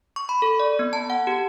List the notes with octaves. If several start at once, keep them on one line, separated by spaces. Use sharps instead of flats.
C#6
B5
A4
D5
B3
A5
F#5
G4